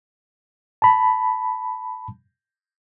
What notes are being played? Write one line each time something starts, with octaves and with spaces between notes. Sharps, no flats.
A5 B5